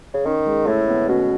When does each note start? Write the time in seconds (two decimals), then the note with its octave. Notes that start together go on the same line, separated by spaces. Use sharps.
0.14 C#3
0.25 D#3 C#4
0.46 G#3
0.67 A2 A3
0.88 B3
1.09 B2 C#4